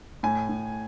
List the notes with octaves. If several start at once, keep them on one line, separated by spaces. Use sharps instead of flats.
A2 G#5
A2